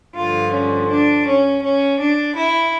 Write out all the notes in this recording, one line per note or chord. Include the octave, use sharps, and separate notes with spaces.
G2 D3 F3 F4
C#4
D4
C#4
C#4
D4
E4